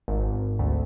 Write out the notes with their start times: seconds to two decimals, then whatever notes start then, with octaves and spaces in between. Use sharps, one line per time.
0.08 G#1
0.59 D2